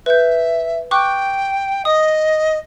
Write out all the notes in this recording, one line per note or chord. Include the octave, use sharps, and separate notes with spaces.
B4 E5 G6
G5 C#6 D6 F#6
D#5 D#6